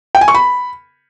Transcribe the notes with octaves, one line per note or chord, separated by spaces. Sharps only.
G5
G#5
C#6
B5